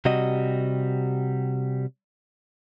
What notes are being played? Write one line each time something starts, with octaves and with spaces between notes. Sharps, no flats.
C3 G3 F#4 D#5